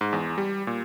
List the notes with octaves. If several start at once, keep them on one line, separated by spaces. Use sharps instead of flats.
G#2
E2
G3
A#2